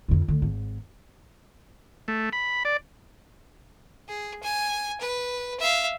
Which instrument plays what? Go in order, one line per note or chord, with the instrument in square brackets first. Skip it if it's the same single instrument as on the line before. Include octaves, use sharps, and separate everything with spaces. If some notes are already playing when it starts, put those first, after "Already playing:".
[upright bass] F2 D3
D2
G#1
[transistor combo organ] A3
B5
D5
[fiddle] G#4
G#5
B4
E5 F5